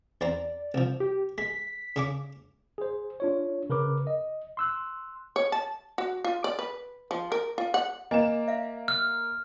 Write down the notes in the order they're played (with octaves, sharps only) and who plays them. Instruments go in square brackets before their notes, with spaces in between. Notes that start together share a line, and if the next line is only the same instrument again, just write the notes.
[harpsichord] E2 C4 A#5 [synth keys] D5
[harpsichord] C2 F3
[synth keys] G4
[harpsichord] G#3 [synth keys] B6
[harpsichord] C#3 C#4 D6
[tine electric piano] G#4 C5
D4 F4 C#5
C#3 A#4 B4 D6
D#5
C6 E6 F#6
[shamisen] C#5
A5
F#4
F4
D5
B4
F3
A#4
F4
F#5
[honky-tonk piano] A#3 E7 [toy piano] D#5 G#5
[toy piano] E5 F5
[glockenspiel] F6